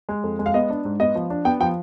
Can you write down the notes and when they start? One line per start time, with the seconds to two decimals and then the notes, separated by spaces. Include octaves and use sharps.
0.09 G#3
0.24 F2
0.39 G#3
0.46 F5
0.54 B3 D#5
0.70 D4
0.85 G#2
1.00 B3 D#5
1.15 F3
1.30 D4
1.45 B3 G5
1.60 F3 G5